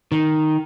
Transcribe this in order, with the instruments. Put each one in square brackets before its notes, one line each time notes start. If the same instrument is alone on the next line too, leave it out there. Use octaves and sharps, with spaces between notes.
[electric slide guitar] D#3